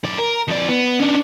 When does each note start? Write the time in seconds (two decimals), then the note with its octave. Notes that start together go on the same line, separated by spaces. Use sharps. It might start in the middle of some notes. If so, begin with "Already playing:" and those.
0.05 F#2 D5
0.19 A#4
0.48 F2 D5
0.69 B3
1.00 C#4 D4